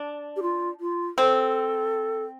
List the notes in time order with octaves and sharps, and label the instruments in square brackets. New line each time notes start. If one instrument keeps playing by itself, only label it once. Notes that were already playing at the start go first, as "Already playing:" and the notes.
Already playing: [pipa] D4
[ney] G4
F4
F4
[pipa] C4 [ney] A4